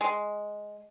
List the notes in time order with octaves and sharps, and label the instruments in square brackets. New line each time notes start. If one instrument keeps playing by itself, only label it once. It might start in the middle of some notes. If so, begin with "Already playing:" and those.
[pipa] G#3